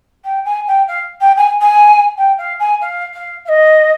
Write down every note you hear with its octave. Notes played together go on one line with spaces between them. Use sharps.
G5
G#5
G5
F5
G5
G#5
G#5
G5
F5
G#5
F5
F5
F5
D#5